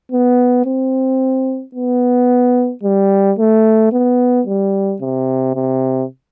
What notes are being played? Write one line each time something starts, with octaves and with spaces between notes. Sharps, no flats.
B3
C4
B3
G3
A3
B3
G3
C3
C3